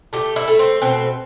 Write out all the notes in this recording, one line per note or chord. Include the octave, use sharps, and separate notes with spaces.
A3 G4
E4
A3
C4
B2 C4